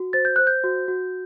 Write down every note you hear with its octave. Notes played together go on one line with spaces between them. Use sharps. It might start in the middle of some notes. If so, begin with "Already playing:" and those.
Already playing: F#4
C5 A6
G6
C5 F#6
G6
F#4
F#4